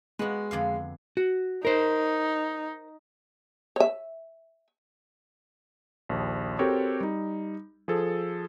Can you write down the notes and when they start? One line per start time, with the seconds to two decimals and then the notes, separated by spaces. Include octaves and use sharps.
0.19 G#3 B3 F#4
0.51 F2 D3 F5
1.17 F#4
1.65 D#4 A#4 C5
3.76 C#5 E5
6.09 A#1 D#2
6.59 C4 F#4 G4 A4 A#4 C#5
7.01 G3 D#4
7.88 F3 G#4 A4